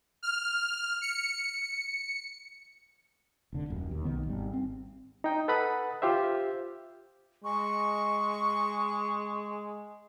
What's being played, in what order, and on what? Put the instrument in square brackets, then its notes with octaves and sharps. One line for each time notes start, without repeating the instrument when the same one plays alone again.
[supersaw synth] F6
C#7
[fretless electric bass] F1 D3
D#1 F#2
D#2
B1 D#3 B3
G#1 G3
C4
[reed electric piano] D#4 G5
A4 B4 F#5 B5 D#6
F4 G4 C5 E5
[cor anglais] G#3 [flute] C#6